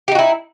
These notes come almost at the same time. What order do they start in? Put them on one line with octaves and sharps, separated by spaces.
G4 D#4 F#4 E4